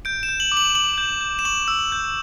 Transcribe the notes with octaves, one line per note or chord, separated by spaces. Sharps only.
G6 D7
E7
G6
F#7
D6
F#7
D6 F#7
G6
G6
E7
C#6 F#7
E6
G6